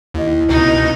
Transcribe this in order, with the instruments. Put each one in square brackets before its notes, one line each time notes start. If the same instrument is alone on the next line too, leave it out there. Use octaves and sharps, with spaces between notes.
[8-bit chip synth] D#2 [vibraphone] E4 D#5
[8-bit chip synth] C#2 B2 [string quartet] D#4